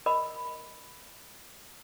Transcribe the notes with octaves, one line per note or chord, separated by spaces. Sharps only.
A#4 D#5 B5